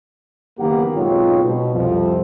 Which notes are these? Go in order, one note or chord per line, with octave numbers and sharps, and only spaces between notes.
F#1 D#3 A#3 B3 G4 F#5
B1 G#2 C4 D#4 F4 C#5
B2
C2 F2 F3